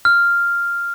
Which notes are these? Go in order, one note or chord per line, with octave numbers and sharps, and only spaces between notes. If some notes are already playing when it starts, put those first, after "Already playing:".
F6